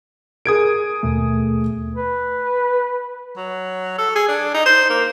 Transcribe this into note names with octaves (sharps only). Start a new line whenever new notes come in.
G#4 A#4 D#6 G#6 D7
D#2 B2 A3
B4
F#3
A4
G#4
D4
D#4
C5
A#3